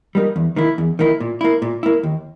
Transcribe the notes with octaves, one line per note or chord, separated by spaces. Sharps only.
G3 A#3 D#4
E2
D#3 A#3 E4
E2
D#3 A#3 E4
A#2
A#3 E4
A#2
A#3 E4
D#2